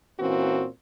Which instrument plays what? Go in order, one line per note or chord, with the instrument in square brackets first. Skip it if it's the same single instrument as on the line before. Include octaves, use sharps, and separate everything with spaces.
[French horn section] A#2 E3 A#3 C4 C#4 F#4